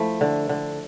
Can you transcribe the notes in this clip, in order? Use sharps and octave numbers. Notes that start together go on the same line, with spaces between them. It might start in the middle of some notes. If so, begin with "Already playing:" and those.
Already playing: F3 A3 E4
D3
D3